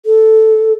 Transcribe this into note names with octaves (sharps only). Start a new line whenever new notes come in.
A4